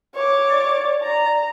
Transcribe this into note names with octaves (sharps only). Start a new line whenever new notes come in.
C#5 D6
D5
A#5